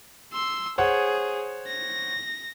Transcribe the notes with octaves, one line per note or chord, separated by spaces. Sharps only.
C6 E6
G#4 C5 C#5 F#5
A#6